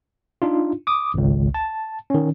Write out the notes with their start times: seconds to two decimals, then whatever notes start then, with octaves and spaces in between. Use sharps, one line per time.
0.42 D4 D#4 F4
0.87 D6 D#6
1.14 G#1 C#2
1.54 A5
2.10 D#3 C#4